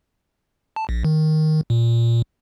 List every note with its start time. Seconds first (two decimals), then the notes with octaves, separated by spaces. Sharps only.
0.76 A5
0.89 A#1
1.05 D#3
1.70 A#2